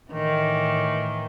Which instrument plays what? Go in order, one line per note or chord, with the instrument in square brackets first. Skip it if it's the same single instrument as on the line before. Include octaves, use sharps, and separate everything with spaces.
[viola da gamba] A2 D#3 E3